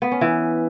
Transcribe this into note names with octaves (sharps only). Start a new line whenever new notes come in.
B3
C#4
E3